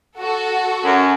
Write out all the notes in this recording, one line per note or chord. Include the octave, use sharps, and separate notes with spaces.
F#4 A4
F#2